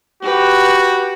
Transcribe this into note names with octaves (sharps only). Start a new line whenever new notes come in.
F#4 G4 B4